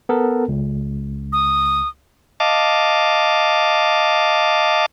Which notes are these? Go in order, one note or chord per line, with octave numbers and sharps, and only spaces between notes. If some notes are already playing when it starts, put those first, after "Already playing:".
B3 A4 A#4
C#2
D#6
D#5 F5 A5 D6